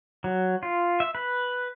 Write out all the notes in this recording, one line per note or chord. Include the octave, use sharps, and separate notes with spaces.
F#3
F4
E5
B4